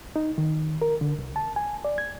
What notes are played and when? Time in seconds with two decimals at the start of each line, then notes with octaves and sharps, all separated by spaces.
0.16 D#4
0.38 D#3
0.82 A#4
1.01 D3
1.19 C2
1.36 A5
1.56 G#5
1.85 D5
1.98 G#6